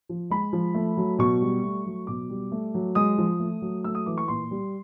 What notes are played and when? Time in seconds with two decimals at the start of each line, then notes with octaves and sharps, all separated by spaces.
0.09 F3
0.30 G#3 B5
0.53 F3
0.74 A3
0.97 F#3
1.19 B2 C#6
1.42 G3
1.63 A3
1.86 F#3
2.07 B2 D6
2.30 G3
2.52 A3
2.74 F#3
2.95 G#3 D#6
3.18 F3
3.40 A3
3.62 F#3
3.84 A3 E6
3.95 D#6
4.06 E3 D6
4.18 C#6
4.28 A#2 C6
4.51 G3